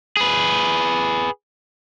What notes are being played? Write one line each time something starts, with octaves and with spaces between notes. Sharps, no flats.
G#4 B4